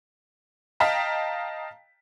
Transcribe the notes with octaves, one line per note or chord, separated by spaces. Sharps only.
D#5 F5 G5 A5 A#5 B6